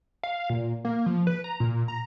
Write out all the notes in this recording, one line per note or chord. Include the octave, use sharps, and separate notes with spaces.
F5
A#2
A#3
F3
B4
A#5
A#2
A#5